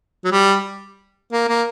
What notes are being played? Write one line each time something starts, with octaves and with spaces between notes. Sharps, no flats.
F#3
G3
A#3
A#3